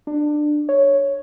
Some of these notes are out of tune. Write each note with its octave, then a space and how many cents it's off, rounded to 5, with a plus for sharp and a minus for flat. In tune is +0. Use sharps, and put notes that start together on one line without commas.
D4 +20
C#5 +0